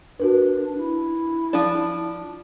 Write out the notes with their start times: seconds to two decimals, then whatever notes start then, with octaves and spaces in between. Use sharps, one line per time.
0.20 D4 F#4 A#4 B4
0.78 E4
1.53 F3 D4